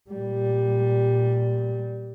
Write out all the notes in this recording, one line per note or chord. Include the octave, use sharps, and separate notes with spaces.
A#2 G3